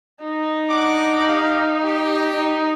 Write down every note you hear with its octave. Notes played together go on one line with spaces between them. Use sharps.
D#4
D4 F#5 D6
G4 F5
G4
D#4